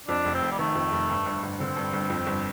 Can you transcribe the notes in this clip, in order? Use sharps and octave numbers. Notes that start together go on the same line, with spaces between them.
F2 D4
F1
C4
F1
G3
D#3 A3
F2
F1
G2
G1
G1
D3 C4
G2
G1
F2
G1